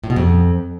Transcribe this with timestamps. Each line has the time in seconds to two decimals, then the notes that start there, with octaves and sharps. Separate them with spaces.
0.04 A2
0.10 B2
0.16 F2